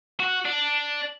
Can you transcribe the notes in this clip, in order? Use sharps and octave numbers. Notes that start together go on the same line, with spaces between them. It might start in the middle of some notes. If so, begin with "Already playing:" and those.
F#4
D4